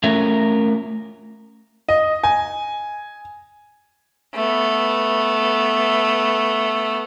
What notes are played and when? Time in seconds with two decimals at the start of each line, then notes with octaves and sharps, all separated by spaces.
0.03 A3 C#4 F4 A#4 C#5 E5
1.89 D#5
2.23 G#5
4.35 A3 B3